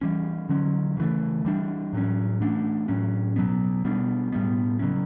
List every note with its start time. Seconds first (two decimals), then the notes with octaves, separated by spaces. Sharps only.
0.01 E3 G3 C#4
0.49 D3 F#3 C#4
0.97 C#3 E3 A3
1.45 E3 G3 D4
1.93 A2 F#3 C#4
2.41 E3 A3 D4
2.88 A2 F#3 C#4
3.36 B2 F#3 B3
3.85 B2 G3 B3 D4
4.32 A2 G3 B3
4.79 C#3 F#3 C#4